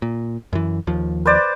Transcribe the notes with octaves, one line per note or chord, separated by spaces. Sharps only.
A#2
F#2 E3
D#2 F3
B4 C5 D5